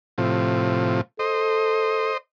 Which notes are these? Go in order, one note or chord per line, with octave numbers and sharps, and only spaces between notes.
A2 C3 F3
A4 C5 D#5